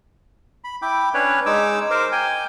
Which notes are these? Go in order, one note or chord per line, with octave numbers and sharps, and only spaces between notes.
B5
E4 G5 D6
C#4 D4 B4 C#5
G#3 D#4 D6 E6
A#4 C5 D6
G5 G#5